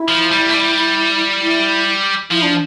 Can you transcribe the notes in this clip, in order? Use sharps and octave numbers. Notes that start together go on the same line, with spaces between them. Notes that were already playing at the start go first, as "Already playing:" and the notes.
Already playing: E4
F3
G3
A3
G3
E4
F3 E4
D4